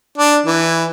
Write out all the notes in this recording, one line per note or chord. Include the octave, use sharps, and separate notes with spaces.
D4
E3